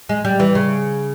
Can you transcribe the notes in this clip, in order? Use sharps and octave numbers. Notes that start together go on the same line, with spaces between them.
G#3
G3
E3
C#3